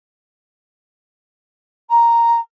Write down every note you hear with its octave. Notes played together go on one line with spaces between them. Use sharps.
A#5